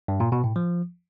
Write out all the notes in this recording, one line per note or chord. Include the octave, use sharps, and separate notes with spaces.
G2
A#2
B2
A2
F3